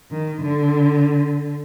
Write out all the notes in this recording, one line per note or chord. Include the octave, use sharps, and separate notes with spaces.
D#3
D3